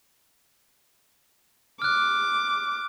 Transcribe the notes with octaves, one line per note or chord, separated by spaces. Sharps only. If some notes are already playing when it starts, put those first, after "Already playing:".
D6 F6 F#6